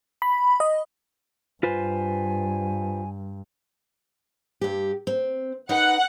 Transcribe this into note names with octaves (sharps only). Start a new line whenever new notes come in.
B5
D#5
G2 F4 B4 C5 G#5
G2 G4
C4
D#4 A#4 B4 F#5